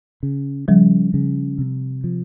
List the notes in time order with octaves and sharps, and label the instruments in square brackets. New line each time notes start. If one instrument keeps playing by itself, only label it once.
[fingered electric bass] C#3
[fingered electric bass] C#3 [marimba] F3 G3
[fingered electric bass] C#3
C3
F3